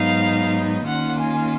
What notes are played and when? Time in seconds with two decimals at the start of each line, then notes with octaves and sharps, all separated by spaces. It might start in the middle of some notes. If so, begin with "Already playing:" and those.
Already playing: G#2 F#3 B3 D#4 F5
0.86 D#3 A#3 C#4 F4 F#5
1.19 G#5